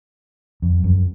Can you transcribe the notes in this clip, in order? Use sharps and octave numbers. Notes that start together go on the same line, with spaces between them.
F2
F#2